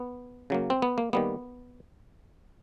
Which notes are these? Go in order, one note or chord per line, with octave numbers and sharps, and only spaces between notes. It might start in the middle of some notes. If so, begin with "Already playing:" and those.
Already playing: B3
C#3 F#3 A#3
C4
B3
A#3
D#3 G3 A#3 B3